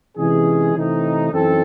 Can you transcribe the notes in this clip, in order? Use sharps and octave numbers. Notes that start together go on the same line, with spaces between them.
C3 E3 G#3 C#4 G#4
C3 E3 A3 C4 D#4
F#2 E3 C4 D#4 A4